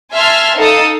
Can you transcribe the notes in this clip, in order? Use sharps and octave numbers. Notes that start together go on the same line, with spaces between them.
E5 G#5 A5 C6 F6
D#4 A4 F5 A5 D#6